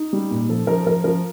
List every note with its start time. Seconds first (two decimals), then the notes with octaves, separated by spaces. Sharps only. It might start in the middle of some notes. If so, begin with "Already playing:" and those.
Already playing: D#4
0.13 G3
0.31 A#2
0.49 F3 A4
0.67 F3 A#4
0.82 A4
0.86 F3 A#4
1.04 F3 A#4